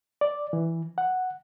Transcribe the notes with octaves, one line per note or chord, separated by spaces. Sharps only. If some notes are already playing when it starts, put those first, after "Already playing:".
D5
E3
F#5